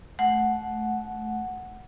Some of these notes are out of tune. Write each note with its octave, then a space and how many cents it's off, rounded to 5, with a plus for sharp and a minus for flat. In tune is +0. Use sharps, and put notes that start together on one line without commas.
A3 -25 F#5 +0